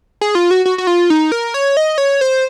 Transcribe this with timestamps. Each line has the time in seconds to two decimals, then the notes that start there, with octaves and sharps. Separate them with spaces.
0.21 G#4
0.35 F4
0.51 F#4
0.66 F#4
0.78 F#4
0.87 F4
1.10 D#4
1.32 A#4
1.54 C#5
1.77 D#5
1.98 C#5
2.21 C5